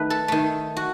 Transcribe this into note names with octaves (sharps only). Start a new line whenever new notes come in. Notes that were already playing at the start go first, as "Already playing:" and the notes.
Already playing: D#3 A3 B4
A4
D#3 A3
F#4